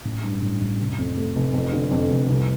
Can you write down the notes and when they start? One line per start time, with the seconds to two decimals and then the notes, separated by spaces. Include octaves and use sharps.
0.05 A1
0.24 G2
0.42 A1
0.61 A1
0.80 F1
0.98 F2
1.17 A3
1.36 F1
1.53 F2
1.73 D3
1.91 F2
2.11 F1
2.29 C2